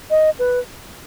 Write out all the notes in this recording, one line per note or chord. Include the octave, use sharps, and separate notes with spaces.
D#5
B4